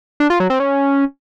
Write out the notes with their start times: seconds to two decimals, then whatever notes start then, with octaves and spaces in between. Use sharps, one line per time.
0.20 D4
0.30 F4
0.40 F#3
0.50 C4
0.60 C#4